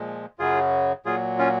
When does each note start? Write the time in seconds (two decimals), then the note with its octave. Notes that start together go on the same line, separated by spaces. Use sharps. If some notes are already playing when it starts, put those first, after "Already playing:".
Already playing: A#2 F3 G#3
0.39 F#2 C#3 F#3 F4 G#4
1.05 A#2 F#3 F4 G#4
1.39 C#4 F4